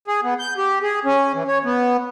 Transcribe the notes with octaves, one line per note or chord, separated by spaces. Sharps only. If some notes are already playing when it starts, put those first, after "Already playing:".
G#4
B3
G6
G4
G#4
C#4
E3
C#5
B3